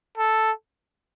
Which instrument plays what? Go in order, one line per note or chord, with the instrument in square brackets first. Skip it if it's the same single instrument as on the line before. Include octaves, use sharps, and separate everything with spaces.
[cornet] A4